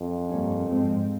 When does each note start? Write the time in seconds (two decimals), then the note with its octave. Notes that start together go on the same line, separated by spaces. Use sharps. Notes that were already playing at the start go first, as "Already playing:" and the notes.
Already playing: F2
0.28 G2 G3 A#3 C#4
0.66 G#2 F3 G#3 C4